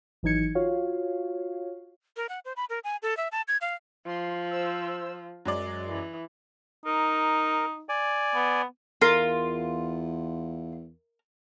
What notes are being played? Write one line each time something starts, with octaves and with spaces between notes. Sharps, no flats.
G#1 E3 F#3 D#4 G#6 C#7
F4 F#4 C#5 F5
A#4
F#5
C5
B5
A#4
G#5
A4
E5
A5
G#6
F5
F3 C6
C5 E6
F#2 F#3 G#3 D5
E3
D#4 A#4
D5 G#5
B3
E2 F4 A#4